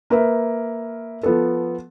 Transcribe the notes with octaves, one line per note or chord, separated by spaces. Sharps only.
A#3 A#4 B4 E5
F3 B3 A4